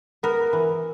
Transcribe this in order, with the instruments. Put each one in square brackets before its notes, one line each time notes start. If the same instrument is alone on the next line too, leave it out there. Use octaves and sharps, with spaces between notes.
[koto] B3 A#4
E3